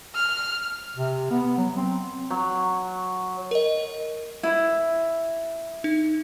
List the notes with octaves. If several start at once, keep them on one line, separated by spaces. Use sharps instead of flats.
F6
C3
B3
F#3
C4
F#3
A#4 D#5
E4
D#4